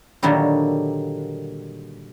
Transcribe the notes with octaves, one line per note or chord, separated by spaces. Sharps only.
A#2 D3 D#3 F#3 G3